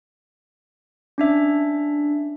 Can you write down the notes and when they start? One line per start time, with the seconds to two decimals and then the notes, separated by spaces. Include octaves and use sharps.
1.18 C#4 D4 E5